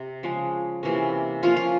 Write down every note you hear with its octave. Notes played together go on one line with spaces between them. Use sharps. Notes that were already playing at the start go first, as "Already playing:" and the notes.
Already playing: C3
C#3 F3 G#3
C3 E3 A#3 C#4
F3 A#3 C#4 F4
F4